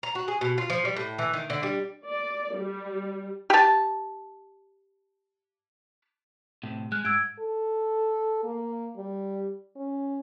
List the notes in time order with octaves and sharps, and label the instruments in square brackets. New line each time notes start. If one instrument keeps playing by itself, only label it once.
[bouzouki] A#5
F#4
G#4
B2
F4
F3
G3
A2
E3
D#3
D3
G3
[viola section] D5
G3
[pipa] G4 A5
[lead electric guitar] A2 C3
[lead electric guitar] G#3 [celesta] F6 F#6
[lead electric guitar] G#2 [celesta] E6 G#6 D7
[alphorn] A4
A#3
G3
C#4